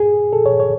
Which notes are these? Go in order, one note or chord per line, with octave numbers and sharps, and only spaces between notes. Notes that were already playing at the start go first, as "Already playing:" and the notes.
Already playing: G#4
A4
C#5
C#5